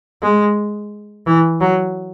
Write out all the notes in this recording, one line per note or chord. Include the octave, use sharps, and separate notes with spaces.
G#3
E3
F#3